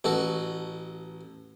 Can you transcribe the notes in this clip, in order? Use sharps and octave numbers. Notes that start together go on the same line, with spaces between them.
A1 F#4 A4